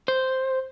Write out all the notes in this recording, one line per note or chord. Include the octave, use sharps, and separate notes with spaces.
C5